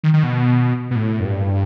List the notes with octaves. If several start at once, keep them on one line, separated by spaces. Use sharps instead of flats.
D#3
D#3
B2
B2
A2
F#2
G2